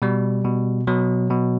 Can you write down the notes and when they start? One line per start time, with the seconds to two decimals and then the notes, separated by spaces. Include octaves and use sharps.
0.02 B2 G3
0.44 B2
0.87 B2 F#3
1.30 B2